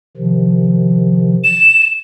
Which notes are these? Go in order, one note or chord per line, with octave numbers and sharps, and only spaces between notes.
C3 D#3 F3
E7